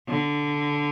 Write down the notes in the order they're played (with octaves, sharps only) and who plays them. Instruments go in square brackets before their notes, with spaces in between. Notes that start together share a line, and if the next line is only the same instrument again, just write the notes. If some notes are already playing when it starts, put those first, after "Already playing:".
[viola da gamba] D3